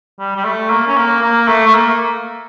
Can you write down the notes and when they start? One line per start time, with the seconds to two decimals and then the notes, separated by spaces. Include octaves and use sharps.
0.19 G3
0.36 G3
0.45 A3
0.70 A#3
0.87 C#4
0.97 A#3
1.22 A#3
1.48 A3
1.67 A3
1.74 A#3